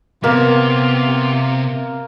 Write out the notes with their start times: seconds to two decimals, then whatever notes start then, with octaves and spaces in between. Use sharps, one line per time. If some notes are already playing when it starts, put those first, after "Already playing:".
0.24 C3 A#3 B3 F4